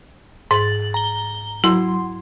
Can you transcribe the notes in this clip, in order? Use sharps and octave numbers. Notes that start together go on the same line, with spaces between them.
G#2 A6 F#7
A#5 G7
F#3 E4 C6